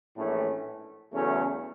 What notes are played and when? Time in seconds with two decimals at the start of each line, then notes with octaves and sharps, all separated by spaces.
0.15 A#1 A2 E3 A3 C#4
1.11 E2 C#3 F#3 A3 C#4